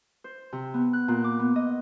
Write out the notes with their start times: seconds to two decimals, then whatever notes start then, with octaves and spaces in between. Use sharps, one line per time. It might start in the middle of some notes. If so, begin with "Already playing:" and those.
0.24 C5
0.53 C3
0.74 B3
0.93 F#6
1.08 A#2
1.24 D6
1.39 B3
1.56 D#5